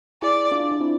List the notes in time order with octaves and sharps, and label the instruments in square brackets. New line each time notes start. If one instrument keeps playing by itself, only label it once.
[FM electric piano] E4 G#4 [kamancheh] D5
[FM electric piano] D4 F4
D4
C4 E4